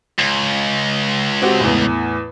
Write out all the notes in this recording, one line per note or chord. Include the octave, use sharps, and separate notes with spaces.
C#2
C4 F#4 G4
E2 A2